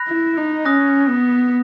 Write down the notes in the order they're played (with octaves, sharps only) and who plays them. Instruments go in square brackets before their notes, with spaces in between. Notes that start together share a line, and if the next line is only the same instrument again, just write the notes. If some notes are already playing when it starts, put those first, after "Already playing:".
Already playing: [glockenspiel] B5 F#6 A#6
[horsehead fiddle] E4
D#4
[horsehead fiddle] C#4 [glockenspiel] D#6 F#6 A#6
[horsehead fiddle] B3